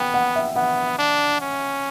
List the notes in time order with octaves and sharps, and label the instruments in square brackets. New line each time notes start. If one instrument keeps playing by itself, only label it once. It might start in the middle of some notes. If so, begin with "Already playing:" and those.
Already playing: [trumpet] B3 [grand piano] G5
[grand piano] F#5
E5
[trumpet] B3 [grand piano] F#5
[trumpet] D4
C#4